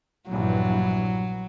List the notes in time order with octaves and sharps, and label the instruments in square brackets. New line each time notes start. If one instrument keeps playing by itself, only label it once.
[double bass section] A#1 G2 E3 [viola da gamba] F#3